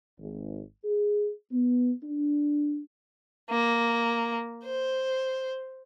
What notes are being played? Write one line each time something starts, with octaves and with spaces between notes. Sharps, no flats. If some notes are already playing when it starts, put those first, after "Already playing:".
G#1
G#4
B3
D4
A#3
C5